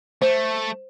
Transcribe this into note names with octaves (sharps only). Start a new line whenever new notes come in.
A3 C5